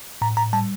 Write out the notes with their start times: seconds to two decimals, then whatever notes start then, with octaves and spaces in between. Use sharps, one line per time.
0.22 A2 A#5
0.37 A2 A#5
0.53 G3 A5